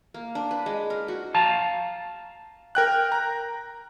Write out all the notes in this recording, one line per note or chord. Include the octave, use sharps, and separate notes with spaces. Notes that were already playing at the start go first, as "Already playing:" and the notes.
A#3
D4
B4
G#3
A#4
F#4
F5 A5 A#5
A#4 G5 F#6
A#5